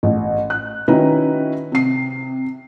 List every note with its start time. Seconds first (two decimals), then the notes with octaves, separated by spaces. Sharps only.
0.03 A1
0.50 F#6
0.88 D#3 C#4 D#4 E4 F#4 B4
1.72 C3 C7